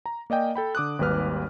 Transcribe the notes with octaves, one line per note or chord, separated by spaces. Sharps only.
A#5
A#3 D5 D#5 G5 G#5
A4 G5 B5
D3 D6 D#6 F#6
G#1 D#2 G3 B4 F6